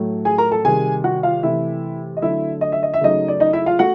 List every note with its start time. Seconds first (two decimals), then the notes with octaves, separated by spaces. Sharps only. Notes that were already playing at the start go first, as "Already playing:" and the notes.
Already playing: A2 F#3 A3
0.25 G#4 G#5
0.38 A#4 A#5
0.52 A4 A5
0.64 C3 D#3 G3 G#4 G#5
1.04 F#4 F#5
1.23 F4 F5
1.43 C3 E3 A3 E4 E5
2.17 D#5
2.22 D3 F#3 A3 E4 E5
2.61 D#5
2.72 E5
2.83 D#5
2.94 E5
3.01 C#3 F#3 A3 D#4 D#5
3.28 D5
3.40 D#4 D#5
3.53 E4 E5
3.66 F4 F5
3.79 A3 F#4 F#5